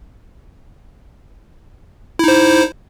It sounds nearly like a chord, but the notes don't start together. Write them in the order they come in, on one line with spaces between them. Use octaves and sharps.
E4 D#4 C5